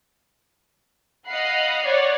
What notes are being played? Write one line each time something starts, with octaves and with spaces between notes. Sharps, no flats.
D#5 F5 F#5 B5 F#6 C7
C#5 D5 F#5